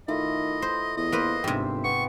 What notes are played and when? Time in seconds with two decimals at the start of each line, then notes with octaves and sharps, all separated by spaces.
0.08 D#3 A3 E4 F4 D#5
0.62 C5
0.97 E2 D#5
1.12 A#3 B4 C5
1.44 G1 G#2 C3 G4
1.84 B3 C#6